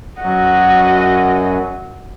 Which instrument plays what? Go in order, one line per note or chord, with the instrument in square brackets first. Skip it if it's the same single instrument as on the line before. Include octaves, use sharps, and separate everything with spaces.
[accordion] F#2 [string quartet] F#4 D#5